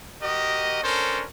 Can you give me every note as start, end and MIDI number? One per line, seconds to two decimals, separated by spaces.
0.21 0.82 66
0.21 0.82 67
0.21 0.82 70
0.21 0.82 75
0.83 1.24 61
0.83 1.24 62
0.83 1.24 69
0.83 1.24 70
0.83 1.24 72